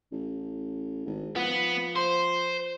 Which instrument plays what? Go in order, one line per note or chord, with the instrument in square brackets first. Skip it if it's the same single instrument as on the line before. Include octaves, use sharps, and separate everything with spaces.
[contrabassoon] A1
G#1
[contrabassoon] F3 [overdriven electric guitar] B3
[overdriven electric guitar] C5